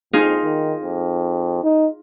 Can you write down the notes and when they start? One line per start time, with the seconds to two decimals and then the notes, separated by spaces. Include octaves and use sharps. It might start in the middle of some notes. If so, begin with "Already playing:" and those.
0.13 F2 D#4 F4 G#4
0.43 D#3
0.83 F2
1.63 D#4